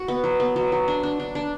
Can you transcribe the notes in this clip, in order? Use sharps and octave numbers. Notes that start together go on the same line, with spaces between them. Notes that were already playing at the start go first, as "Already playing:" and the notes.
Already playing: F#4
B3
F#3
B3
F#3
F#3
D4
D4
D4
D4